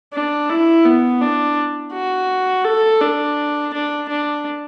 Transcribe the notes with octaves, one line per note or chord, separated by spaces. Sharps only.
D4
E4
B3
D4
F#4
A4
D4
D4
D4